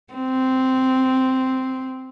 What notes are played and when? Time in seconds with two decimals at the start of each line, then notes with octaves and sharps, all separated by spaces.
0.14 C4